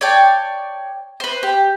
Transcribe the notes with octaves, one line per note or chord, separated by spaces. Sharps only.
C#5 D5 G5 A5
B4 C5
G4